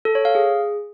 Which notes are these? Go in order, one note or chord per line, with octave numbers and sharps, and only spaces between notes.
A4
C#5
F5
G#4